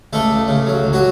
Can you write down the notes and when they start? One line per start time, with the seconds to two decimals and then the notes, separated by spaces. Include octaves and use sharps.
0.13 C#2 A3 A4
0.31 C#2
0.48 C#3
0.67 F#3
0.84 C#2
0.93 F#3 F#4